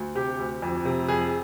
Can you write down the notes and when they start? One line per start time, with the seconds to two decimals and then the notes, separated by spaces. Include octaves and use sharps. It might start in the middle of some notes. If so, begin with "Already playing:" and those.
Already playing: D2
0.15 C3 G4
0.39 D2
0.62 F2
0.85 C3
1.08 F2 G#4